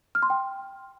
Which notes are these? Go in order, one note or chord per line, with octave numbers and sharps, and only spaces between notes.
F6
C6
G5